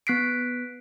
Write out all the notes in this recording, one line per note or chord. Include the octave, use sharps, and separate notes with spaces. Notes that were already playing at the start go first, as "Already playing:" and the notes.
B3 F#6 B6 C7 D7